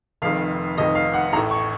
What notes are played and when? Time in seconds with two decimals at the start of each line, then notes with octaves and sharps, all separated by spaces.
0.22 F1 F2 D#3 F5
0.78 F1 F2 D#3 D#5
0.95 F5
1.13 F#5
1.32 A1 A#5
1.36 A2
1.51 C#6